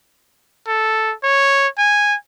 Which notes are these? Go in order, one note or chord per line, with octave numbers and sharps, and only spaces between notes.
A4
C#5
G#5